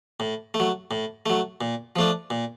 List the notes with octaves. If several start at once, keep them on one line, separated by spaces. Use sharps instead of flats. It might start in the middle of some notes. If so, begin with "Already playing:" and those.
A2
A3
F#3
A2
F#3 A3
A#2
F3 A3 D4
A#2